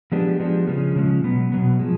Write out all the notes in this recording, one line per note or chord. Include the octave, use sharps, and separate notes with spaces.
F3 G#3 B3 D4 G4
F3 G#3 B3 D4 G4
C#3 F3 G#3 C#4
C#3 F3 G#3 C#4
B2 F#3 B3
B2 F#3 B3
F3 G#3